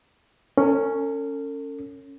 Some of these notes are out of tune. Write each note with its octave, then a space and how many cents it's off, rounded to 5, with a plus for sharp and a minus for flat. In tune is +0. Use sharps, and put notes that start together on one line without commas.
C#4 +0 A4 +45